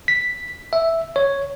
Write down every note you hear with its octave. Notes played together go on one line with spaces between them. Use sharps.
B6
E5
C#5